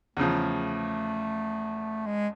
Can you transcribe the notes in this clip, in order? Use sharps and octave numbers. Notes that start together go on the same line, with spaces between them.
E2 C#3 F3 A3
G#3